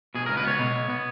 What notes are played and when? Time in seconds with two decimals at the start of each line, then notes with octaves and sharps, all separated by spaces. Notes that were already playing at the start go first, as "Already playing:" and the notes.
0.15 B2 G#4
0.26 C#2 A#4
0.37 B4
0.45 B3 C#5
0.59 B2
0.75 B3
0.90 B3